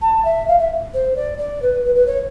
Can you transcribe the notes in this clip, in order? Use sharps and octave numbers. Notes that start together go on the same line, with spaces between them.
A5
E5
F5
E5
C5
D5
D5
B4
B4
B4
C#5